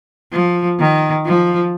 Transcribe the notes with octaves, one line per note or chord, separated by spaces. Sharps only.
F3
D#3
F3